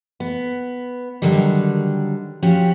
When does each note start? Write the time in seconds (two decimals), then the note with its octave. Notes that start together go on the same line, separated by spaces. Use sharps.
0.20 B3
1.22 D3 D#3 F#3 G3
2.42 F3 C#4 F#4 G4